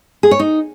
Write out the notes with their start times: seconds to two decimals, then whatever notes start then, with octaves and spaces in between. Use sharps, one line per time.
0.23 G#4
0.31 C#5
0.39 D#4